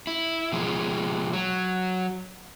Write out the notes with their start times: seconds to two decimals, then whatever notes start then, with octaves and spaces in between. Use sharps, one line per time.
0.07 E4
0.52 B2 F3 G#3
1.33 F#3